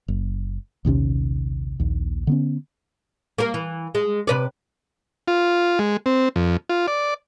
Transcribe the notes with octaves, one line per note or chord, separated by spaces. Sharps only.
F#1
A#1 D#2 C3 C#4
A#1 D#2
D3 B3 C#4
A#3 A#4
E3
G#3
C3 B4 D5
F4
G#3
C4
F2
F4
D5